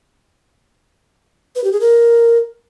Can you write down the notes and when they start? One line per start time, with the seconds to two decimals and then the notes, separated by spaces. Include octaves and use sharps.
1.56 B4
1.64 G4
1.72 G#4
1.80 A#4